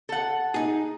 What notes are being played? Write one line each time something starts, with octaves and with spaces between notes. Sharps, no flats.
A4 F#5
D#4 G#4